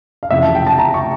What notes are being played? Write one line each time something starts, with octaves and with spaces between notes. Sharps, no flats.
F5
F1 F2 C#3 E3 E5
A5
G5
A5
A#5
C#6